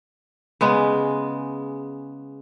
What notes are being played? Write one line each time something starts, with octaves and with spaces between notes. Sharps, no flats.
C#3 G#3 B3